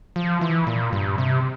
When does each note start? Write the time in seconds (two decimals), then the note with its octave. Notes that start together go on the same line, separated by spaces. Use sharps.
0.16 F3
0.41 E3
0.67 A#2
0.93 G2
1.18 C3